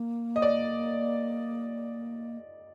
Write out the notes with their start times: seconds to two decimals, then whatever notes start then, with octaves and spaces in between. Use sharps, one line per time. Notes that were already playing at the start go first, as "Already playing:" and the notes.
Already playing: A#3
0.36 D#5
0.42 D5